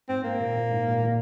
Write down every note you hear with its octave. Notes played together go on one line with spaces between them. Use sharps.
G#2 C4
A#3
A#2
A#2
G#2
A#2
A#2